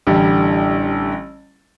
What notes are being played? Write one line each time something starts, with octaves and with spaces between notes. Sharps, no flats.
A1 D3 G3